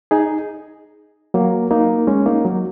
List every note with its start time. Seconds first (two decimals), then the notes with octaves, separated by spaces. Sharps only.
0.11 D#4 G#4
1.34 F#3 A#3
1.71 A#3 D#4
2.07 G#3 C#4
2.26 A#3 D#4
2.45 F#3